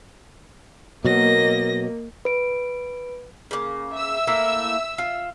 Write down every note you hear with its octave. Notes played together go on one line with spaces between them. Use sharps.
B2 F#3 A#3 D#5 A#6
B4 D7
C#3 A#3
E5 E6
A3 A#3 E4
F4